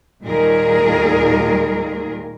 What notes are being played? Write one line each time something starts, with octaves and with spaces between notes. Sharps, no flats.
D#2 A#2 G3 G#4 A#4